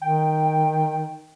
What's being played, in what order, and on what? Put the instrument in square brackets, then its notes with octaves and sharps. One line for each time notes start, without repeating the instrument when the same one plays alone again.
[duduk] D#3 [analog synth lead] G5